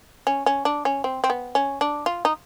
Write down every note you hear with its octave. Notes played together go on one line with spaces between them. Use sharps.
C#4
C#4
D4
C#4
C4
C4
B3
C#4
D4
F4
D#4